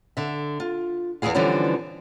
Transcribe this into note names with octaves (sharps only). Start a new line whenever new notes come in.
D3 E5
F4
E2 E3 E4 G#4 F5
D3 E3 F3 G3 B3 C#4